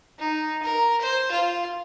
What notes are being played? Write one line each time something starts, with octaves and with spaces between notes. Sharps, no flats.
D#4
A#4
C5
F4